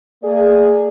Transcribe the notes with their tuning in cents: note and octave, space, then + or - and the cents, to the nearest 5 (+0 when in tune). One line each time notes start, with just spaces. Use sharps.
A#3 -45 G#4 +0 D5 +10